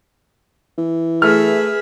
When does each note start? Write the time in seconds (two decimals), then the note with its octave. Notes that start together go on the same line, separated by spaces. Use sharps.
0.78 E3
1.22 A3 G#4 B4 E5 F6